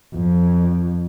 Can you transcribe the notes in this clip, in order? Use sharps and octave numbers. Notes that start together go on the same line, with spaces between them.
F2